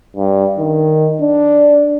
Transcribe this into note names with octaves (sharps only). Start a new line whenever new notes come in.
G2
D#3
D4